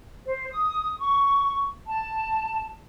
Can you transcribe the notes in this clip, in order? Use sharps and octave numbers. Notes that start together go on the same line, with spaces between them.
C5
D#6
C#6
A5